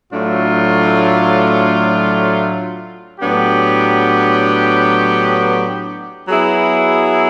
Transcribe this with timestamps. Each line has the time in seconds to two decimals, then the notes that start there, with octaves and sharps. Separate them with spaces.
0.12 A2 F#3 A3 D4 F4
3.20 A2 F#3 B3 D4 G4
6.28 F#3 B3 E4 G#4